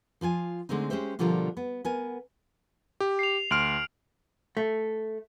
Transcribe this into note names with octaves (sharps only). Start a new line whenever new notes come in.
F3 F4 G5 G#5
D3 G#3 A3 C4 D#4
G#3 C#4 G4 C5 E5
B2 D3 F3 G3 F4 A#4
B3
B3 A#4 G#5
G4
C7 F7
D2 C6 F6 D7 F#7
A3